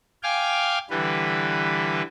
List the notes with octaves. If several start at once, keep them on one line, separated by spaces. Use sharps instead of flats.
F5 G5 G#5 D6 F6
D3 E3 G3 B4